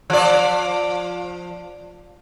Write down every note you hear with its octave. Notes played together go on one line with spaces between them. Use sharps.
F3 D5